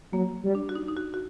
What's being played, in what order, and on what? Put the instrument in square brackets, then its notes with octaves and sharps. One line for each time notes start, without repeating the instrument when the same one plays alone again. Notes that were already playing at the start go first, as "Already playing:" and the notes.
[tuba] F#3 [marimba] A#3
[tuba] G3
[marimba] D4
F#4
D#4
D#4
F#4
F#4